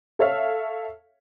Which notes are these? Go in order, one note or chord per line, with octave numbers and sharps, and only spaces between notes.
A4 C#5 E5 F5